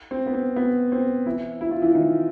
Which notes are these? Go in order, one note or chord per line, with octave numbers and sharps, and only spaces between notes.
C4
B3
C4
B3
C4
E3 E4
E4
F4
E3 E4
D#3 D#4